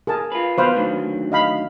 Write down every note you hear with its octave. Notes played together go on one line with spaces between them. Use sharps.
G#4 A#4 A5
F4 B4
B2 B4 C5 F5
D2 D#3 F#3
D#5 F5 B5